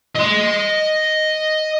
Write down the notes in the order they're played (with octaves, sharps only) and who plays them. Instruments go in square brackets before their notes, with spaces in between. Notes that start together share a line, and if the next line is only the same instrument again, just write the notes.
[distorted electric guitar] D#5 C6